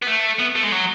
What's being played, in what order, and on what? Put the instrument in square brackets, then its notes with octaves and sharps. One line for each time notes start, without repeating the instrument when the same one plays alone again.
[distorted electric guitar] B3
A3
B3
A3
G#3
F#3